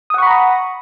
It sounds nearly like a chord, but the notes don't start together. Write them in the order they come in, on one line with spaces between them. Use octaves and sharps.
D#6 F#5 C#6 B5 A#5